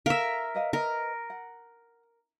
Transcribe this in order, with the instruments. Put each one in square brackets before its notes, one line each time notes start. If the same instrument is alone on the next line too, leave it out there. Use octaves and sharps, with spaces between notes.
[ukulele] A4 F5 [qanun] A#4 E5
[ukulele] B4 D#5 F5
[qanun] A#4 [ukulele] B4 D#5
[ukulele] F#5